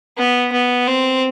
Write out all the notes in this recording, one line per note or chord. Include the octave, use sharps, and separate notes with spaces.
B3
B3
C4